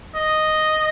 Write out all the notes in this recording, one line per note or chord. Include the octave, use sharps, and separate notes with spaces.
D#5